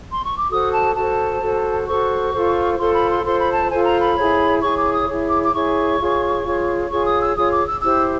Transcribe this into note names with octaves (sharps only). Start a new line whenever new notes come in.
C6
C#6
D6
F#4 A4 C5 D#6
A5
F#4 A4 C5 A5
F#4 A4 C5
F#4 A4 C5 C#6
F4 A4 C5
F4 A4 C5 C6
B5
C6
F4 A4 C5 C6
B5
A5
F4 A4 C5 G#5
A#5
B5
E4 G#4 C#5
E4 G#4 C#5 C#6
D6
D#6
E4 G#4 C#5
D6
D6
E4 G#4 C#5 C#6
F4 G#4 C#5
F4 G#4 C#5
F4 G#4 C#5 C#6
D#6
E6
F4 G#4 C#5 D#6
D6
E6
E4 G4 C5 E6